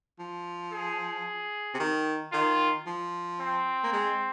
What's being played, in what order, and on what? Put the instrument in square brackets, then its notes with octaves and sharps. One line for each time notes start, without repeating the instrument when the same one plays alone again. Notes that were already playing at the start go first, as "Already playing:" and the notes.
[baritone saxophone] F3
[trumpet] G#4
[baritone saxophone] C3
D#3
[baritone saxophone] D#3 [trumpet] F4
[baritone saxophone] F3
[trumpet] C4
[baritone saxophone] A#3
G#3